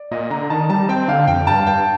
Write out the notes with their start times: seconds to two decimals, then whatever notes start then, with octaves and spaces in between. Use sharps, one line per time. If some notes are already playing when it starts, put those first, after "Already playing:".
Already playing: D5
0.11 A#2 D#5
0.31 D3 A#5
0.50 D#3 A5
0.70 G3 A5
0.89 C4 G5
1.08 D3 F5
1.27 F2 G5
1.47 G2 A5
1.67 G2 G5